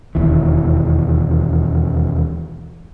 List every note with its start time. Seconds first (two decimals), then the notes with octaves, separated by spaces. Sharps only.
0.15 E1 D#2 E3